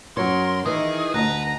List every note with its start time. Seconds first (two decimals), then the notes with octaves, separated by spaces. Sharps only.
0.17 F#2 F#3 A#4 C#5 C6
0.66 D#3 E3 G#4
1.14 D2 B4 D#5 A#5